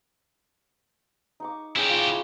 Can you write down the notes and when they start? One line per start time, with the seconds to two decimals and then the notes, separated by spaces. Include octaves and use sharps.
1.40 D#4 C#6 D6
1.76 C#4 E4 G4 G#4
1.89 F4